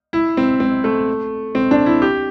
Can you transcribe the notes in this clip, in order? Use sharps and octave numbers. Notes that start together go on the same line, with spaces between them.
E4
C4
C4
A3
C4
D4
E4
G4